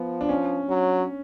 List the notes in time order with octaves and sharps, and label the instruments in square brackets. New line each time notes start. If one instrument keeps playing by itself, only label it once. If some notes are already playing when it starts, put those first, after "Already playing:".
Already playing: [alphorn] F3 [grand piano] B3
[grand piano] D4
C#4
[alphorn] F#3